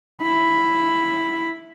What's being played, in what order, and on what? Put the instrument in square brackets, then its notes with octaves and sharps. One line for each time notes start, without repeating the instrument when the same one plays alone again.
[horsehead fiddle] E4 B5